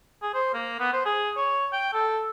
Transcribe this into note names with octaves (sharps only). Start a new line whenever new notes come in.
G#4
C5
A#3
B3
C5
G#4
C#5
G5
A4